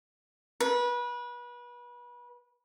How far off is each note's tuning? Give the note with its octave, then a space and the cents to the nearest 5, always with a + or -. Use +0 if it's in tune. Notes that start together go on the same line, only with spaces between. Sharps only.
B4 -30